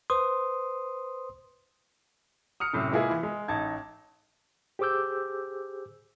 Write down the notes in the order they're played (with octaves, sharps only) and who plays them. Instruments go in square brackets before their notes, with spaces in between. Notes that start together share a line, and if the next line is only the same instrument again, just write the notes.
[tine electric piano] B4 C5 C6 D#6
[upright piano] D#6 F6 C#7
F#2 A2 C3
G#3 A#3 E4 F4 G#4 B4
E3
G#3
A1 D#4 A5 G#6
[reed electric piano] G4 G#4 C5 D6 E6 G6